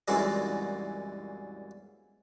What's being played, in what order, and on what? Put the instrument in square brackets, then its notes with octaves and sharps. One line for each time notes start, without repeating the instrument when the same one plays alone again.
[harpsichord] C2 F#2 A#2 E3 F#3 G#3